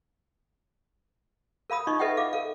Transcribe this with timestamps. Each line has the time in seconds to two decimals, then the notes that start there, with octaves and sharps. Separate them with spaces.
1.70 A#4 F5 B5 D#6
1.87 D#4 F4 D#5 C#6
1.99 A4 B4 D#5 E5 F#5 G5
2.17 F5 D6
2.33 A4 A#4 F5